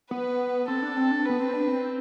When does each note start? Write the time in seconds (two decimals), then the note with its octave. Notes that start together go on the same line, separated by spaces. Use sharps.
0.11 B3 B4
0.68 C4 A4
0.82 D4
0.97 C4
1.11 D4
1.25 B3 B4
1.40 C4
1.53 D4
1.68 C4